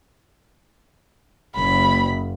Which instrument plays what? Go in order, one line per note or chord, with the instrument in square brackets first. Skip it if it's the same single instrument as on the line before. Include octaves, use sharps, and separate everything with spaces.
[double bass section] F#1 [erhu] B5